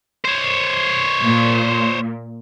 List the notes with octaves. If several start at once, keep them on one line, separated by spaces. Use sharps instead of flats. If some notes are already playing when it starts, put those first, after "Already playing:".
C5 C#5
A#2